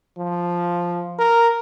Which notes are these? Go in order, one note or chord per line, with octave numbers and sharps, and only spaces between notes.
F3
A#4